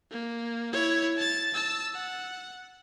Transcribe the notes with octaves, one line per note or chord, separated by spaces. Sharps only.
A#3
E4 C#5
A5 A6
A5 E6
F#5